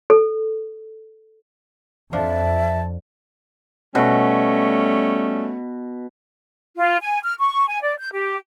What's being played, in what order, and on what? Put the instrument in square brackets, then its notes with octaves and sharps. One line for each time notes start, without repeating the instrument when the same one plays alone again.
[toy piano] A4
[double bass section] F2 [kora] F3 D4 F4 [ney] E5 [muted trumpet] A5
[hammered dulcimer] B2 [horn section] G3 A3 C#4
[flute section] F4
G#5
F6
C#6
G#5
D5
G6
G4